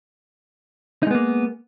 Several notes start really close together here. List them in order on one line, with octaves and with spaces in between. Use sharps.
D#4 G#3 B3 A#3